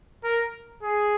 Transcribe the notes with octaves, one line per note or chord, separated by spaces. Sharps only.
A#4
G#4